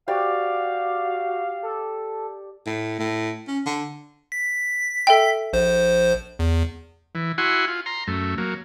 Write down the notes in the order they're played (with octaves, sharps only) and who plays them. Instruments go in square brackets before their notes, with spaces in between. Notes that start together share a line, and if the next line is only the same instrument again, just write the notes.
[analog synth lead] F#4 [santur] G4 D5 [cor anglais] F5
[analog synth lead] A4
[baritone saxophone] A2
A2
C#4
D3
[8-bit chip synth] B6
[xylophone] A4 E5 G5
[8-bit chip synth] A#1 C5
E2
[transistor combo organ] E3
E4 F#4 F#5 G#5 C6
F4
A#5 C6
F#2 A3
F#3 A#3